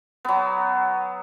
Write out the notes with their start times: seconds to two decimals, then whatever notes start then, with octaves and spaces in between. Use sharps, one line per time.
0.25 F#3 B3